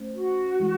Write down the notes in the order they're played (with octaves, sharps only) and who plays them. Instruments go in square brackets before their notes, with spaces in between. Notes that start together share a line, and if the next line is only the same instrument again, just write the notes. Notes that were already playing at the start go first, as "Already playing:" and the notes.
Already playing: [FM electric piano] A3 C#4 C5
[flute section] F#4
[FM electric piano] E3 G#3